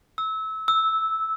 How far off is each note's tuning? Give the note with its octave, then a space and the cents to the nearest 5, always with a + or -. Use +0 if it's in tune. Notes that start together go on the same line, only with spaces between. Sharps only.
E6 -25
E6 -10